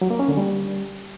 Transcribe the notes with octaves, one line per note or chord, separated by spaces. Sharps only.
F#3
A#3
C#4
D3
G3